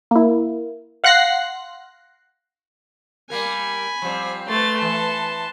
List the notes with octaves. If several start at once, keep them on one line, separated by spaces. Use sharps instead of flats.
A#3 E4
F5 F#5 C6 F#6 A#6 C7
G3 A#3 A#4 G#5 B5
F3 G3 C4
A3 B4 C6 A6
E3 A5